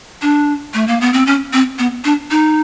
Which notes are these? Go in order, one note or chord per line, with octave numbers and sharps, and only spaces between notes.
D4
A3
A#3
B3
C4
C#4
C4
B3
D4
D#4